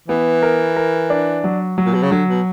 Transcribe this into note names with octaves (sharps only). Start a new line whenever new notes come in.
E3 B3
A#4
A#4
D4
F#3
F#3
A#2
B2
C#3
D3 F#3
B2